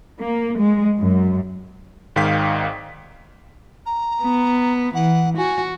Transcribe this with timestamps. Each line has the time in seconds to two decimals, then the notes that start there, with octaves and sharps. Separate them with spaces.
0.21 A#3
0.59 G#3
0.98 F#2
2.16 G#1 G#2 D#3 F5 G5 B6
3.86 A#5
4.22 B3
4.94 E3 F#5
5.38 F#4 G#5